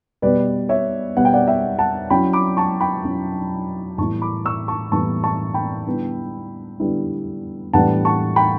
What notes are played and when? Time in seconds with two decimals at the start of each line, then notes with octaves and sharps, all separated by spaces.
0.22 B2 G3 B3 B4 D5
0.69 C#5 E5
1.16 B2 G3 B3 F#5
1.25 G5
1.33 D5 F#5
1.48 E5 G5
1.78 F#5 A5
2.10 F#3 C#4 E4 G5 B5
2.33 B5 D6
2.57 A5 C#6
2.81 G5 B5
3.05 F#3 C#4 E4
3.98 A2 E3 G3 B3 E4 A5 C#6
4.22 B5 D6
4.45 C#6 E6
4.68 A5 C#6
4.92 A2 E3 G3 B3 E4 A5 C#6
5.24 A5 C#6
5.54 G5 B5
5.86 D3 G3 B3 E4
6.80 D3 G3 B3 E4
7.73 A2 E3 G3 B3 D4 F#5 A5
8.05 A5 C#6
8.36 G5 B5